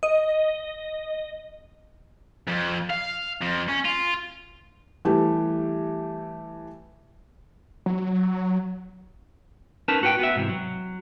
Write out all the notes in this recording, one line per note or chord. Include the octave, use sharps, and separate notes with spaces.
D#5
F2
F5
F2
C#4
F4
E3 G3 A3 G4
F#3
C#4 D#4 A#4 B4 A5
A2 F#4 B4 G5
B3 F#4 E5
G#2 C3 E3
F#3